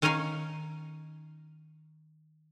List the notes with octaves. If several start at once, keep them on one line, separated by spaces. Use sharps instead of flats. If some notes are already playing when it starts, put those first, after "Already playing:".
D#3 C#4 D#4 D#5 F5 G#5